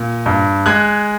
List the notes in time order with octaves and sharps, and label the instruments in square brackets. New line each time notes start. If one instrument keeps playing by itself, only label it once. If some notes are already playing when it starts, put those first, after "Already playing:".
Already playing: [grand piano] A#2
G2
G#3 F#6 G#6